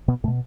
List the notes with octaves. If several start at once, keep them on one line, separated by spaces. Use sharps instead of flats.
B2 B3
A2 A3
B2